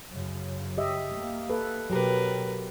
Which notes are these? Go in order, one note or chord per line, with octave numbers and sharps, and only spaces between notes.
F#2 C#3
G4 D#5 E5
A#3
A4 B4
B2 F#3 G4 A#4 B4